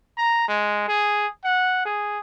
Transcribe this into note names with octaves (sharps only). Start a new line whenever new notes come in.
A#5
G#3
G#4
F#5
G#4